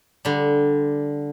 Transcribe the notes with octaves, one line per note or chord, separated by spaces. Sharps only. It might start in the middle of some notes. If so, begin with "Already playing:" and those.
D3 G3